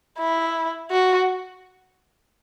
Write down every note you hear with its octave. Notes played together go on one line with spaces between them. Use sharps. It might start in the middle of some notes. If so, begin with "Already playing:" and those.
E4
F#4